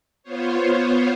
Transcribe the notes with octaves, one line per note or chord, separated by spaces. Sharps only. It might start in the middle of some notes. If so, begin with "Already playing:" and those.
B3 F4 C5 C#5